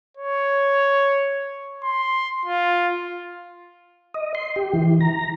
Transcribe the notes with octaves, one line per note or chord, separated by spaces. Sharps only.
C#5
C6
F4
D#5
C6
G4
E3
A#5